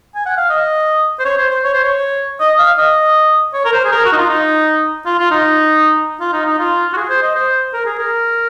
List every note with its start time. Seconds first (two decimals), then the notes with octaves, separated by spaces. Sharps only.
0.15 G#5
0.26 F#5
0.37 F5
0.50 D#5
1.19 C5
1.25 C#5
1.38 C5
1.50 C5
1.64 C#5
1.74 C5
1.84 C#5
2.40 D#5
2.59 F5
2.78 D#5
3.54 C#5
3.65 A#4
3.73 C5
3.85 G#4
3.92 A#4
4.05 F#4
4.12 D#4
4.18 F4
4.30 D#4
5.06 F4
5.19 F4
5.31 D#4
6.20 F4
6.33 D#4
6.46 D#4
6.59 F4
6.93 F#4
6.97 G#4
7.10 C5
7.22 D#5
7.35 C5
7.73 A#4
7.86 G#4
7.99 A#4